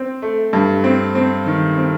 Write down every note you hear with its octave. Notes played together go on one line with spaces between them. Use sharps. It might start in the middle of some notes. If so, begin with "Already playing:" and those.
Already playing: C4
A3
G2
C4
C4
D#3
C4